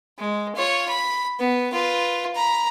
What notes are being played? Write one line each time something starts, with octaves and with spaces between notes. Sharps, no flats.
G#3
F4 C#5
B5
B3
F4 B4
A#5 B5